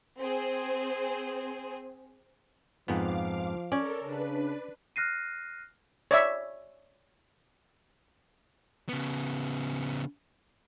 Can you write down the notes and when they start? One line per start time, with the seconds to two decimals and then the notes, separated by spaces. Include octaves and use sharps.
0.19 C4 G#4 C5
2.88 F2 G#2 F3 B3 F5 D6
3.72 C#4 A4 A#4 D5
4.04 C#3 D4 B4
4.96 F6 F#6 A#6 C7 D#7
6.11 C#5 D5 E5
8.89 C#3 B3